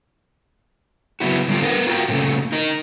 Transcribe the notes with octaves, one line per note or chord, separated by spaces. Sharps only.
C#3 F#3 B3 E4 F#4
D3 G3 D4 F4 G4
B3 A#4 B4 F#5
F4 F#4 G#4 A#4 G5
A#2 C#3 A3
D#4 A#4 D#5